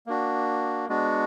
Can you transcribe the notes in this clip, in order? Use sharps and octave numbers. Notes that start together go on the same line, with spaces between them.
A#3 D4 F#4
G#3 B3 D4 F#4